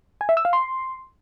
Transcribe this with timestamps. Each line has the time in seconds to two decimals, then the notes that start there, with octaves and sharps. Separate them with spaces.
0.21 G#5
0.29 E5
0.37 E6
0.45 F5
0.53 C6